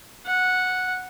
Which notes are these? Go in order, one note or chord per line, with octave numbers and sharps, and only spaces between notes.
F#5